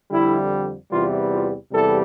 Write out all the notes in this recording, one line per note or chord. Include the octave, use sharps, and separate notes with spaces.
F2 D3 G3 E4
E2 C3 E3 G3 F4
F4
E2 C3 E3 G3 A4